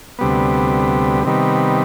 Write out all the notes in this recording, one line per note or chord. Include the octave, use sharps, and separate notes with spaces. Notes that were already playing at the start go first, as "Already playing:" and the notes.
D2 C3 G3 B3
C3 D#3 G3 B3